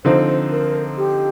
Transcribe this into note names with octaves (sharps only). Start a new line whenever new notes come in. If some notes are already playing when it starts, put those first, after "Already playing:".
D3 F3 C4 D#4 C5
A#4
G4